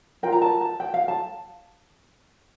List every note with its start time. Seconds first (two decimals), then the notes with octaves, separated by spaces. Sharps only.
0.23 F4 A#4 G5
0.32 A#5
0.42 A5
0.61 A5
0.80 G5
0.94 F5
1.08 A5